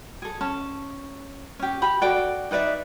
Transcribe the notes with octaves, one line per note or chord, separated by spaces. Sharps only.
G#4 A4
C#4 A5
C#4 G4
G4 B5
F#4 A4 D5 G5
D#4 B4 D5 E5